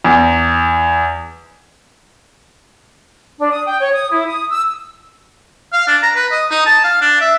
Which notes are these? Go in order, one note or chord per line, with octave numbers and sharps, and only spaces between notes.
E2
D4
D#6
G5
C#5
D#6
E4
D#6
E6
F5
D4
A#5
B4
D#5
D#4
A5
F5
D4
E5